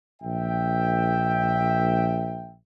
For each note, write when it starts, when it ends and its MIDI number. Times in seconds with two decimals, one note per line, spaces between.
0.22 2.55 34
0.22 2.55 76
0.22 2.55 79